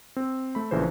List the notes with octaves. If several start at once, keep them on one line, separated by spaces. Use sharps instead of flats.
C4
A3 B5
A#1 C#3 E3 A#4 C5